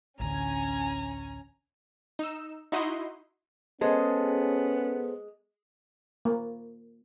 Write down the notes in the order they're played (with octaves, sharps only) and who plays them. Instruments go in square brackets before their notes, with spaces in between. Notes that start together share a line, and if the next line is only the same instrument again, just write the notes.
[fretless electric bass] A1 D2 D3 [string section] C#4 G#5 [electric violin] A#5
[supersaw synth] D#4 E6
D#4 E4 F#4 D#5 C6
[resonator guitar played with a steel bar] G#3 [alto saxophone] B3 [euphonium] C#4 [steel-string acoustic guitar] G#4 A4 C5
[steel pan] A#3